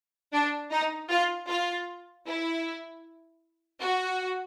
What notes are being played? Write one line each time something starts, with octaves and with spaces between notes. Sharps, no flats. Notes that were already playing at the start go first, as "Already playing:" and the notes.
D4
D#4
F4
F4
E4
F#4